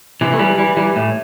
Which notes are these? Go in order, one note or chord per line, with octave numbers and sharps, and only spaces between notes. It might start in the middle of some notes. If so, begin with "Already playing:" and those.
C3 E3
A3
E3 G3
E3 G3
E3 G3
A2